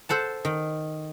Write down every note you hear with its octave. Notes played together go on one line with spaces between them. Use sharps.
A4 C5 F#5 A5
D#3